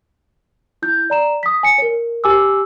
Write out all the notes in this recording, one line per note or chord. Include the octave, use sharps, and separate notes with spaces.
E4 G6
D5 A#5 E7
D#6 B6
G#5 C#7
A#4 C#5
G4 G#5 D6 E6